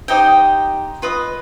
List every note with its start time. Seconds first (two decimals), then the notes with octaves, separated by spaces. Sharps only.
0.08 D#4 G4 C5 D#5 G5
1.02 F4 B4 D#5